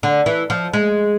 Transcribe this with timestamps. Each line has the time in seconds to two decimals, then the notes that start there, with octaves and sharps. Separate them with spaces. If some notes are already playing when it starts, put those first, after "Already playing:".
0.03 D3
0.26 E3
0.50 F3
0.73 G#3